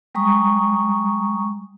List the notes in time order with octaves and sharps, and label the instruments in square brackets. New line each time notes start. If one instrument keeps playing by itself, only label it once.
[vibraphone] G3 G#3 A#5 C#6 D#6